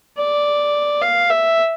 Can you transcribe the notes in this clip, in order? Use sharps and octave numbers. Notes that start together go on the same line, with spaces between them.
D5
F5
E5